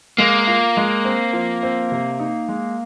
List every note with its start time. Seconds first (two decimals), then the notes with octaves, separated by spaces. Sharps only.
0.18 G#3 A#3
0.47 F4
0.77 G#3
1.05 C4
1.33 F3
1.63 C4
1.92 C3
2.20 D#4
2.48 G#3